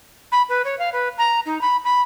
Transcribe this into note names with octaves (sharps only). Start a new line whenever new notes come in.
B5
B4
C#5
F5
B4
A#5
D#4
B5
B5